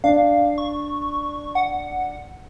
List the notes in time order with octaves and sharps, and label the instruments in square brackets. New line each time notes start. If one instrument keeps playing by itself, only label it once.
[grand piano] D4 [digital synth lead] F5
[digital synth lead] C#6
F#5